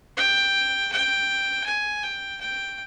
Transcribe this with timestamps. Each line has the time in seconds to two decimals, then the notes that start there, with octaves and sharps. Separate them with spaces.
0.17 G5
0.92 G5
1.66 G#5
2.03 G5
2.41 G5